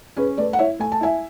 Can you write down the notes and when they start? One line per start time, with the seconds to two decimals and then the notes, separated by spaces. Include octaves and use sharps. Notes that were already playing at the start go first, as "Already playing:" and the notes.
0.16 C#4 G#4 B4
0.38 A3 B4 D5
0.53 F#5
0.59 E4 C#5 E5
0.80 A3 G#5
0.92 A5
1.01 E4 E5 G#5